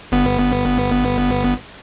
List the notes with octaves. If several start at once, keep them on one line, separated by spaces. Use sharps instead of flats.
G1 B3